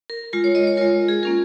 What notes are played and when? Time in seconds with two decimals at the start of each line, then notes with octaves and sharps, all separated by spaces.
0.10 A#4
0.33 G#3 F4 A#4
0.44 C#5
0.55 D#5
0.67 C#5
0.77 G#3 F4 A#4
1.08 G#4
1.23 A#3 C#4 F4 A#4